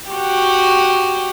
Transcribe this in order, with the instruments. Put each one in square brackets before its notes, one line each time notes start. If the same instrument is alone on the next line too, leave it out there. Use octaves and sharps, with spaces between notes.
[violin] F#4 G4